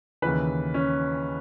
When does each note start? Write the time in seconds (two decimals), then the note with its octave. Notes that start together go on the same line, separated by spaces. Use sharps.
0.22 D#2 C#3 E3 B4
0.74 C#4